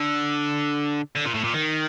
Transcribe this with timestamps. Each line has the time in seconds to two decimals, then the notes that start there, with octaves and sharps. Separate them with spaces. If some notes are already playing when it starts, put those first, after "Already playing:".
Already playing: D3
1.16 D3
1.26 A#2
1.34 A2
1.44 A#2
1.54 D#3